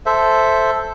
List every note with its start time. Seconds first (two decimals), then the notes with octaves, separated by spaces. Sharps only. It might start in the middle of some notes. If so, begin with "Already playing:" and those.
0.06 A4 C5 E5